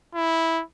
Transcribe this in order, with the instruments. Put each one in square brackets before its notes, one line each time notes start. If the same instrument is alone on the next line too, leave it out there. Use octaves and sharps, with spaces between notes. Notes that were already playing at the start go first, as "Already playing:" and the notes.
[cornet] E4